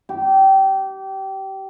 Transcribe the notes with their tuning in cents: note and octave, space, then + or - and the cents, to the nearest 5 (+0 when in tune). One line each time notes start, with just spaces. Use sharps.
G4 -25